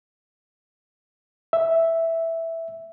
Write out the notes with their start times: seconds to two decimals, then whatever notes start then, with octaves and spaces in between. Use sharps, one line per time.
1.53 E5